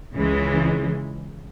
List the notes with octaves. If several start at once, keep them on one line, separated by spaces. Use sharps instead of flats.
C#2 C#3 E3 G#3